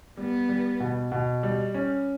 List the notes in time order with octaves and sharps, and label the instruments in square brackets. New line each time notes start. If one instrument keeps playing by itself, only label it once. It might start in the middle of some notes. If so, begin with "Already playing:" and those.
[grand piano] G3 [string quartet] B3
[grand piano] G3
B2
B2
G3
C#4